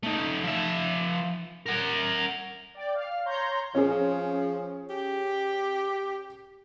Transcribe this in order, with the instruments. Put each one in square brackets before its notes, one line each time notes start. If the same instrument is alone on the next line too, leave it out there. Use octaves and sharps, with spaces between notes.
[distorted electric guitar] A3 D#4
F3 E5
A#4 F#5
[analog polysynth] D5 G5
F5
C#5 A#5 C6 G6
[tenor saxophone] F3 [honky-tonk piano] C#4 G#4
[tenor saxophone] G4